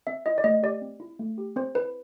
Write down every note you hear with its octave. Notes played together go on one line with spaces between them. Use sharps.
C4 E5
E4 D#5
D5
A3 D#5
G4 D5
C4
E4
A3
G4
C4 C5
E4 B4